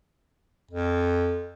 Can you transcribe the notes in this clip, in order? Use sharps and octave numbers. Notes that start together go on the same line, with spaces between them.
F2